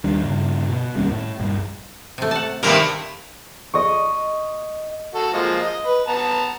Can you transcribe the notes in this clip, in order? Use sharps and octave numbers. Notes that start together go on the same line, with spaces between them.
D#2 G3 D4
G2 C#3
B2
F1 D#2 G3 C#4
A2
A#1 G2
C3 A3
F#5 A5
G2 C3 D#3 A#3 A#4
D#5 C#6
F#4 A4
F3 G#3 A#3
D#5
B4
B3 A5 A#5